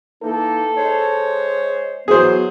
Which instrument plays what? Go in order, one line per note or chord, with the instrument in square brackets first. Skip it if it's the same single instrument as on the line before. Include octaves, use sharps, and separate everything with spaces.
[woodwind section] E3 A#3 D#4 [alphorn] A4
[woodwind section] G#3 C5 C#5
[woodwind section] E3 B3 [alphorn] F#3 [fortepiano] G#4 C5